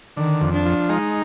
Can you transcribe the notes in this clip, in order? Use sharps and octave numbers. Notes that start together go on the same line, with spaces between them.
D3 D#3
F2
D4
F3
G#3 D#4